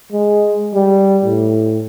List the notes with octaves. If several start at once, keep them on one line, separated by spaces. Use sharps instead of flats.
G#3
G3
A2